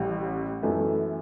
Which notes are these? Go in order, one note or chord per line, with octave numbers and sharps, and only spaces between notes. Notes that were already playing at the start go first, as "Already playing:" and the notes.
Already playing: A1 A2 G3
F#2 E3 A3